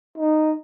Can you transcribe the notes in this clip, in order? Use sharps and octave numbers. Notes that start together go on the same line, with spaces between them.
D#4